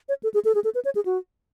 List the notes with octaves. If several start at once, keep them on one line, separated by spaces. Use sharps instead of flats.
C#5
A4
G#4
A4
G#4
A4
B4
C#5
G#4
F#4